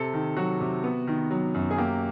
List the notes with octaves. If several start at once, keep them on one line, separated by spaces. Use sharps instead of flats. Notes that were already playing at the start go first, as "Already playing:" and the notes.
Already playing: C3 A4
D#3
F#3 F#4
C3
B3
D#3
F#3
F#2
G#4
A#3 G4